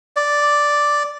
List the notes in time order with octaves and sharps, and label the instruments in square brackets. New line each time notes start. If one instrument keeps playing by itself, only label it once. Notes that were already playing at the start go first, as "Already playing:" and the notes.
[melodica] D5